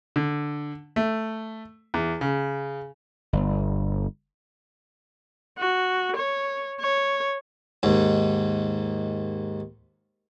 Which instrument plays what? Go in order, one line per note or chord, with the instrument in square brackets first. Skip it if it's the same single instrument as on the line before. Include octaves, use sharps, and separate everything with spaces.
[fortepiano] D3
A3
E2
C#3
[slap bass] G1
[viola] F#4
C#5
C#5
[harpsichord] D#2 G#2